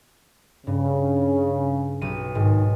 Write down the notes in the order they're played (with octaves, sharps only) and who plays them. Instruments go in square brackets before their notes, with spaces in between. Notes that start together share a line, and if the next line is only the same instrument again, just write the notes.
[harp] G2 [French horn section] C#3
[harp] B1 G4 D#7
[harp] G#2 [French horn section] D#3